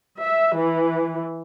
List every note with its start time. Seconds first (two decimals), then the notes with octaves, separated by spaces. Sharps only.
0.22 E5
0.58 E3